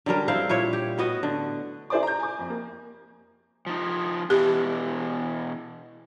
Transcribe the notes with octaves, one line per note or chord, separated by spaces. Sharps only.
D3 F#3 G3 A#4
C4 E4 C5 F5
A#2 E4 C#5
G4
A2 B3 F#4 D#5
D3
E4 A4 C5 D5 G#5 D6
A#5 G6
G#5 D6
F2
A#3
F3 D#4
B2 E3 G4